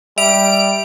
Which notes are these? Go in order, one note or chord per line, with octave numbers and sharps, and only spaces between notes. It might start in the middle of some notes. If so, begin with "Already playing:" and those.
G3 E5 D7 F7